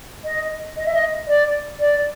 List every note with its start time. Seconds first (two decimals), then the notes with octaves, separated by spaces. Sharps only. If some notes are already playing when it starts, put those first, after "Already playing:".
0.24 D#5
0.77 D#5
0.86 E5
0.94 D#5
1.28 D5
1.79 D5